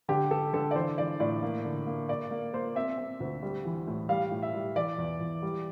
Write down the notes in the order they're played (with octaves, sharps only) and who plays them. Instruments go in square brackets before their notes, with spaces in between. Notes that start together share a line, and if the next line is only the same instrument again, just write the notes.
[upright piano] D3 G4
D3 A4
D3 A4
D5
E3 C5
E3 D5
A2 D5
A#3
D3
A#3
A#3 D5
A#3
A#3 C5
C4 E5
C4
D2
G3
E3
A2
G3 F5
A2
E5
G3
E3 D5
E2
E2
G3